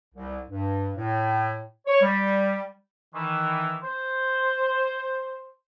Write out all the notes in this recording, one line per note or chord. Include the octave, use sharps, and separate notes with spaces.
C2
G2
A2
C#5
G3
D#3 E3
C5